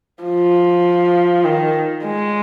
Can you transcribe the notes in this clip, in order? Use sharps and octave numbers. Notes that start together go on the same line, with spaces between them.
F3
D#3
G#3